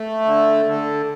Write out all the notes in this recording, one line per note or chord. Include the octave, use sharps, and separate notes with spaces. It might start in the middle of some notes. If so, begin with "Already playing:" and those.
Already playing: A3
D3
D3